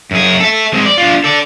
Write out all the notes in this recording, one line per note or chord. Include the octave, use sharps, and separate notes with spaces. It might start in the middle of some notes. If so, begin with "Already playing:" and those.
F#2 G#4
A4 E5
G#3 C4
D5
D4 F4
A4 D5